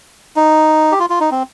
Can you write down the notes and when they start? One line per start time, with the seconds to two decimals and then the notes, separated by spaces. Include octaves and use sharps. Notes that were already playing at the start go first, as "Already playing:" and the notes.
0.36 D#4
0.92 G4
0.99 F4
1.10 F4
1.20 D#4
1.31 C4